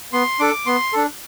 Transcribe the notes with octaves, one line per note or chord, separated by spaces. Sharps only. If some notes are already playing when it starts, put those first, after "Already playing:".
B3 C6
D4 A4 D6
B3 C6
D4 A4